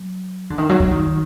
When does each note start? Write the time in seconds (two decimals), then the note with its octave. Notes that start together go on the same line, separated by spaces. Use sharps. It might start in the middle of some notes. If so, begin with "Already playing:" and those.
Already playing: F#3
0.50 D3
0.58 D#3
0.69 F#3
0.80 F#3
0.91 D#3